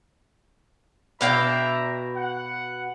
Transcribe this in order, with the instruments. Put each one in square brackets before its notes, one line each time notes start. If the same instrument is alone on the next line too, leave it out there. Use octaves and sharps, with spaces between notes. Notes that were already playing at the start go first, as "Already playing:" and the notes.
[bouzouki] B2 F5 G5 [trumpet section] D4 E5 A#5
[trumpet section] F#5